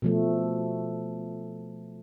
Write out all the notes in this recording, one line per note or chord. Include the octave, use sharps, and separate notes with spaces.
B2 F3 A3